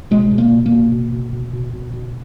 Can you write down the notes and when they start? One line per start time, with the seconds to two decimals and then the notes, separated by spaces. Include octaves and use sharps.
0.11 B2 G#3
0.31 B2
0.38 A#3
0.52 B2
0.66 A#3
0.72 B2
0.92 B2
1.12 B2
1.33 B2
1.53 B2
1.73 B2
1.94 B2